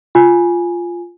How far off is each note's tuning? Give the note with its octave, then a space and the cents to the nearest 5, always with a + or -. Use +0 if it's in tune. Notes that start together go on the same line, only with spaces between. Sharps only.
F4 +0 G#5 +0